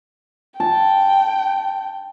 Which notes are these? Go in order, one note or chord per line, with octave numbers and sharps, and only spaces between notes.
G5 A5